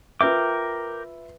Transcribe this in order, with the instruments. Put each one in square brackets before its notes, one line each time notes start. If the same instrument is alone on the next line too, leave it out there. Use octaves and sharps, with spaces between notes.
[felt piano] F4 B4 E5 [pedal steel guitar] A#4 G5 D6